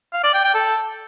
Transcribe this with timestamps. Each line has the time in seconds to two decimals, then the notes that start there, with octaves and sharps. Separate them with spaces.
0.13 F5
0.24 D5
0.34 G5
0.44 G5
0.54 A4